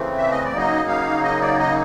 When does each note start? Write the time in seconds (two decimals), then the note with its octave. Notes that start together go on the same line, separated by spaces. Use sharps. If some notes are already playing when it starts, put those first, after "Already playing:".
Already playing: C#3 E3 A3 C4
0.18 E5
0.31 D#5
0.44 D5
0.53 C#3 F#3 A#3 D#4 D#5
0.88 F5
1.24 D#5
1.42 D5
1.59 D#5